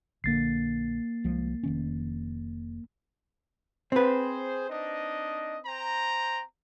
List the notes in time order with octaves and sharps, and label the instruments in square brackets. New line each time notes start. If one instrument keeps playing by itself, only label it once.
[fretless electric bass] A#1 D3 [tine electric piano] A#3 A6 C7
[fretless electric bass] C2 F3 G#3
F1 D#3 C#4
[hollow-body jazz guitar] C4 B4 [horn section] G#4 C5
[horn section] D4 D#4 D#5
C5 G5 A#5